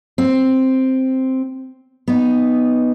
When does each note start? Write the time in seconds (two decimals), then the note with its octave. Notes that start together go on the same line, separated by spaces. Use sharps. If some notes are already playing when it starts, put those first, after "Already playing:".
0.18 C4
2.08 B3 D#4